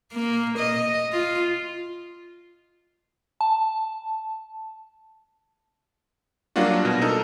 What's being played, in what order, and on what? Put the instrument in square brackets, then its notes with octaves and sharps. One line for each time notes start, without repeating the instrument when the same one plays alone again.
[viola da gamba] A#3
D#5
F4
[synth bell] A5
[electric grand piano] F#3 G3 A#3 D4 F4 F#4
B2
D#4 A4 A#4